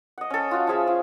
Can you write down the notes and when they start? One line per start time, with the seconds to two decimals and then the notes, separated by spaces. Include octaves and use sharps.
0.18 D#5 F#5
0.30 C#4 A4
0.51 F4 F#4
0.67 F3 G#3 G#4 E5
0.87 F4